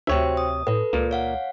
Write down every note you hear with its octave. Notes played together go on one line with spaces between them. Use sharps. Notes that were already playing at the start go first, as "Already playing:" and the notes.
D2 C3 F#4 C5 C#5 E5 G5
D#6
A2 A4 B4
C#2 A#2 A#3
C#5 F5 F#5